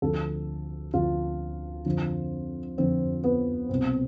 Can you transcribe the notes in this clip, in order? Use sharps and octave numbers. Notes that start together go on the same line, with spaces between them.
D2 D3 F3 A4
D2 D3 F3 F4
F2 D3 F3
F2 D3 F3 C4
B3
C2 B2 C4